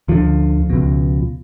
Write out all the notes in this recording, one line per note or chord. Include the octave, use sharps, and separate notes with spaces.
D2 D3 F3
C#2 B2